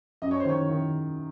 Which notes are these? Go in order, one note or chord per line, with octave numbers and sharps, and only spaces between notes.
F#2 D#5
C#5
C5
D#3 C#5
D#3